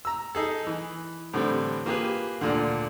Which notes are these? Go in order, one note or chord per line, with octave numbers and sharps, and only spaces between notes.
A#5 E6
D#4 G#4 A4
E3
A2 D3 E3 G3 C4
A#3 F4 G4 G#4 B4
D2 A#2 D3